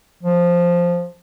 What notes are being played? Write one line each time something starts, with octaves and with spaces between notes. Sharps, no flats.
F3